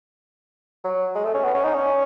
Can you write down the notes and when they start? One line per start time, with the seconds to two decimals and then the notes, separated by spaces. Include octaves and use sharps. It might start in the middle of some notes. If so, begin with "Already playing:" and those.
0.84 F#3
1.15 G#3
1.25 A3
1.34 C#4
1.44 B3
1.54 C#4
1.64 D#4
1.75 C#4